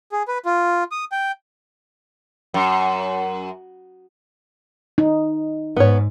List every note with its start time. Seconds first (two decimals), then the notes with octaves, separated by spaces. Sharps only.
0.12 G#4
0.28 B4
0.45 F4
0.91 D#6
1.12 G5
2.54 F#2
4.98 D#4
5.76 G#2 B3 C#5